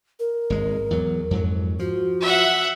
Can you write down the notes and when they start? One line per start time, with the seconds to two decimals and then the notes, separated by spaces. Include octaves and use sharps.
0.20 A#4
0.50 G#1 G#3
0.91 E2 F#3
1.31 F2 G#2 F#3
1.79 F3 F#4
2.21 E5 F#5